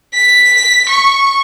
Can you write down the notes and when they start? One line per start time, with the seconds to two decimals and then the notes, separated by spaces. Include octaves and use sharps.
0.15 B6
0.90 C#6